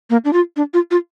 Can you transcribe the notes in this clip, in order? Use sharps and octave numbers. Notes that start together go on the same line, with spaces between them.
A#3
D4
F4
D4
F4
F4